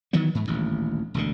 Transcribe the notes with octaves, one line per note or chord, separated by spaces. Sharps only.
D#3 E3 F#3 B3
G#2
D#1 A1 D2
E1 D2 D3